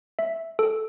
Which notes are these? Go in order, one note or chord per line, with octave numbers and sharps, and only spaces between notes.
E5
A4